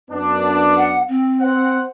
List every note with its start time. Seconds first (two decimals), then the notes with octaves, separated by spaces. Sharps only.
0.10 F#2 B3 D4
0.77 F#5
1.08 C4
1.40 C5 F#5